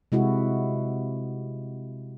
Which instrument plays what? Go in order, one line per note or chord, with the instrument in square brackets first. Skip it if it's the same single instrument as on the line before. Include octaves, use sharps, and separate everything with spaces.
[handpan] C3 G#3 E4 F#4